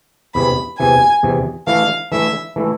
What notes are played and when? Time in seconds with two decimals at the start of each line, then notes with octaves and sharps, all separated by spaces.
0.34 E2 C3 E3 B5
0.79 E2 C3 E3 G#5
1.23 E2 C3 E3
1.67 E3 A3 E4 F5
2.12 E3 A3 E4 E5
2.56 E3 A3 E4